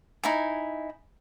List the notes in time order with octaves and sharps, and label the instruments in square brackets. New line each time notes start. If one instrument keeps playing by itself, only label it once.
[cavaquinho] D#4 E4 G#5